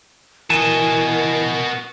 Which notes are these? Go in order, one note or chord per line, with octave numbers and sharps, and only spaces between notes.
E3 F#4 A#4 D#5 G#5 A5